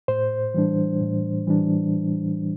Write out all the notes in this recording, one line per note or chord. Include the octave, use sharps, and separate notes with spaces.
A2 C5
E3 G3 D4
A2
E3 G3 D4